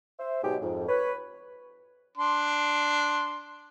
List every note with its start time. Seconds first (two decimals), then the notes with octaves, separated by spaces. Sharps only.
0.19 C5 E5
0.43 G#2 B2 F#3 G#3 G4
0.62 F2 G#2
0.89 B4 C#5
2.17 D4 C6